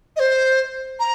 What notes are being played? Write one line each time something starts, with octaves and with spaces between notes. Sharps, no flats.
D#5
C5
A#5